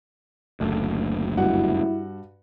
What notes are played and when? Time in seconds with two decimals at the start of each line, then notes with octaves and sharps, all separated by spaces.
0.60 F#1 D2 A3
1.37 G2 E4 F#4 F#5